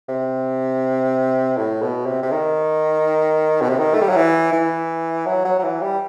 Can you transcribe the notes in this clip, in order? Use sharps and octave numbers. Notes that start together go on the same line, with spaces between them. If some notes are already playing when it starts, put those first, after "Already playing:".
C3
A2
B2
C3
C3
D#3
B2
C3
D#3
A3
G3
F#3
E3
E3
F#3
F#3
F#3
E3
G3